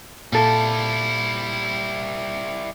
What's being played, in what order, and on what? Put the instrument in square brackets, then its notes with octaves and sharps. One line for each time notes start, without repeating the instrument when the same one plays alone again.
[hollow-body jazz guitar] A#2 A4 [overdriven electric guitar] G3 E4